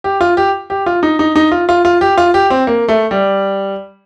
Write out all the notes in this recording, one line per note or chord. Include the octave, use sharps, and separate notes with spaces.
G4
F4
G4
G4
F4
D#4
D#4
D#4
F4
F4
F4
G4
F4
G4
C4
A#3
A3
G3